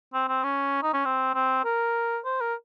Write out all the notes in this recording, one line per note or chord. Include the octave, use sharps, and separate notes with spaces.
C4
C4
C#4
D#4
C#4
C4
C4
A#4
C5
A#4